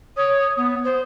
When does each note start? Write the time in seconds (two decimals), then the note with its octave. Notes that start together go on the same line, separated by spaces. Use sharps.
0.17 C#5 D#6
0.57 B3
0.84 C5